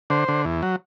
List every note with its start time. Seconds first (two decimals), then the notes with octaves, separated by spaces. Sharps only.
0.10 D3 C5
0.28 D3
0.45 E2
0.62 F#3